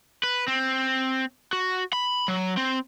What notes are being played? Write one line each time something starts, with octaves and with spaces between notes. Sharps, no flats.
B4
C4
F#4
B5
F#3
C4